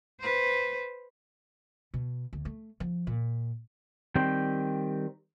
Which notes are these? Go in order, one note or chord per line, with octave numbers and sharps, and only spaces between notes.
B4 C5
B2
D2
A3
F3
A#2
D#3 G3 C4 G5